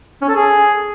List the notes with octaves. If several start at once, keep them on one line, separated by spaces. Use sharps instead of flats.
C#4
A4
G#4